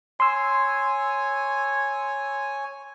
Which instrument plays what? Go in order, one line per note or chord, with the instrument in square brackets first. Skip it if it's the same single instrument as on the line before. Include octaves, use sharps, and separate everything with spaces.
[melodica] C#5 G#5 [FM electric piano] C6 E6